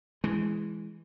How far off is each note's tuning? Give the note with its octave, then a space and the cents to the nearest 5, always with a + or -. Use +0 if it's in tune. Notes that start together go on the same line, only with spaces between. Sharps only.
E3 +0 G#3 +0